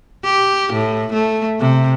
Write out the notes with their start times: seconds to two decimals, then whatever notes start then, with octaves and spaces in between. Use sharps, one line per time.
0.24 G4
0.73 A2
1.13 A3
1.59 C3